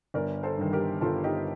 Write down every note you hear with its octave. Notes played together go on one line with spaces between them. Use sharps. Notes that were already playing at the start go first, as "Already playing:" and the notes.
G1 A#4 D5
A4 C5
G2 D#3
G4 A#4
G1 F4 A4
D#4 G4